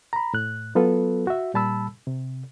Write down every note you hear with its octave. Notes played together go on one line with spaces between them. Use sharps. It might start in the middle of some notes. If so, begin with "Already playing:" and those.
A#5 B5
A2 F#6
F#3 B3 F4 A4 B4
F#4 E5
A#2 G3 A5 B5 E6
C3